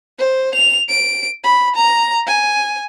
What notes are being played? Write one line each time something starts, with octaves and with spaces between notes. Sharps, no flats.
C5
F7
D7
B5
A#5
G#5